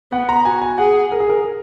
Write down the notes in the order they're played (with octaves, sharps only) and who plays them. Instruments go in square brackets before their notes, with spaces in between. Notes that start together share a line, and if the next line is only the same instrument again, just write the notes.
[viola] B3 [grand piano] F#5
[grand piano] A#5
[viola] F#4 [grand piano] G#5
[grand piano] G#5
[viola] G#4 [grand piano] F#5
[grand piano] A#4
G#4
A#4